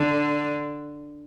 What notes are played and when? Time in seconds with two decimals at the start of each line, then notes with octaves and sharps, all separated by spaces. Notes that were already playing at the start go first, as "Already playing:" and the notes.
Already playing: D3